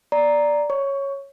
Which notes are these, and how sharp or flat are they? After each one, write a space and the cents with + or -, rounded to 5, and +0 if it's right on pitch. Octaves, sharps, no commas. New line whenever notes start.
D5 +0 A#5 +0
C#5 -5 C#6 +15